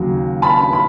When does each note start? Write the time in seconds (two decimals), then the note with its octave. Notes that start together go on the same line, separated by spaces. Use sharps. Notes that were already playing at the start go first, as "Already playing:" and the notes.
Already playing: D#2 C#3 F#3
0.42 A5 B5
0.73 B5